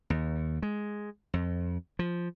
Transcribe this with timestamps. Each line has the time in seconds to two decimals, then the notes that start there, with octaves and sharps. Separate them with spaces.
0.10 D#2
0.62 G#3
1.34 F2
1.99 F3